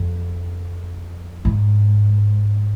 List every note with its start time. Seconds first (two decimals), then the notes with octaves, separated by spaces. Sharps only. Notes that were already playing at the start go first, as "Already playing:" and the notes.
Already playing: F2
1.45 G#2